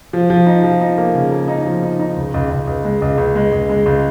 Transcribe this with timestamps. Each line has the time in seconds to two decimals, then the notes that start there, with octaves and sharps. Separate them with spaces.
0.13 F3
0.30 F3
0.46 D#4
0.63 F3
0.81 D#4
0.98 A#3
1.14 C#3
1.31 A#3
1.48 D#4
1.66 F3
1.83 D#4
2.00 D#4
2.16 C#2
2.34 C#2
2.50 C#2
2.67 C#2
2.85 G#3
3.02 C#2
3.18 C#2
3.35 G#3
3.53 C#2
3.69 G#3
3.86 C#2